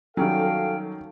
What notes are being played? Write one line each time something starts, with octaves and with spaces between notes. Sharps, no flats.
D#3 F#3 G3 C#4 F#4 A4 F5 G5